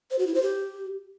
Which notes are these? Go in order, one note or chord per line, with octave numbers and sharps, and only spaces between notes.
C5
F#4
E4
C5
G4